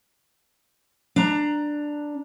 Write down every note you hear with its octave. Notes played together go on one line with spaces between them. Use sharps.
D4 A#5